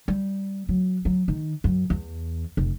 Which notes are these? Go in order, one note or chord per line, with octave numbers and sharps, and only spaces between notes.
G3
F#3
F#3
D#3
F#2
E2
F1